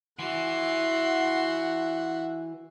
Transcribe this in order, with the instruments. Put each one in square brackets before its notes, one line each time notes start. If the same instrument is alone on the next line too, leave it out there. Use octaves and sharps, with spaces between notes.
[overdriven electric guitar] E3 [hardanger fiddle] F#4 C6 [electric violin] E5 F#5